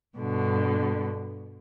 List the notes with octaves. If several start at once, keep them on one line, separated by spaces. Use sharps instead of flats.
G2 B2 D3